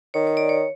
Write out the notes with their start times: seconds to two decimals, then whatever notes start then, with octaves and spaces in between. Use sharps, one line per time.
0.14 D#3 C#5
0.27 C#5
0.37 D5
0.49 C#5